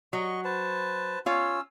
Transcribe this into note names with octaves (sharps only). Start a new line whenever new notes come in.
F#3 D#5 C#6
B4 C5 A5
C#4 F4 C#5 E6